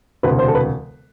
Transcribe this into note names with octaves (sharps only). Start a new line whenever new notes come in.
E1 D2 C3 B4
C5
A4
B4